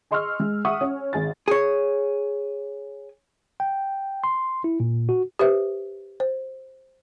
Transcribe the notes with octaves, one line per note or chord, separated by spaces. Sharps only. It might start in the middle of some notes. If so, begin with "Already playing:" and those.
G#4 D#5 C6 C#6 E6 F6
G#3
E5 F#5 C#6 D#6
C#4
G#1 G#4 A6
G#4 C#5
G5
C6
E4
A#2
F#4
G4 B4 C5 E5
C5